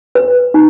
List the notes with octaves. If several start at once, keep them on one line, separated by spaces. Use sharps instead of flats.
B4
D#4